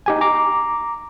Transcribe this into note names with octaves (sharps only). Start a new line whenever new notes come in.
D#4 G4 G#5
A#5 D6